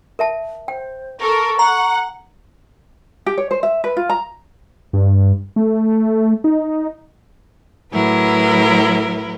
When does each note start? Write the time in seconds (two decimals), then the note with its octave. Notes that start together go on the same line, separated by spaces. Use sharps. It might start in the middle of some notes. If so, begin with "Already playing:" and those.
0.19 A#4 E5 A5
0.68 C5 G5
1.21 A4 A#4 C#6
1.59 F#5 A#5
3.26 G4
3.38 C#5
3.51 C5
3.63 E5
3.84 B4
3.97 F4
4.10 A#5
4.93 G2
5.56 A3
6.44 D#4
7.92 A2 F#3 E4 A#4 B4